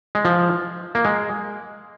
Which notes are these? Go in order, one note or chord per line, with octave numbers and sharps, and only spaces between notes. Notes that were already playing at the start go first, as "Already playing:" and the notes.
G#3
F3
A#3
G#3